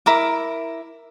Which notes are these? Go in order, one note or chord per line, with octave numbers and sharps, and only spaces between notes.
E4 A#4 D6